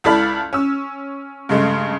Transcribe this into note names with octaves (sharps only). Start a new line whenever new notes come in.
C#2 E4 A4 D5 B5 F6
C#4 E6
G2 C#3 G#3 A3